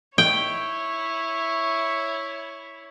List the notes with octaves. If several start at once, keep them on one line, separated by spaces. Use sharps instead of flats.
E4 C#5 G5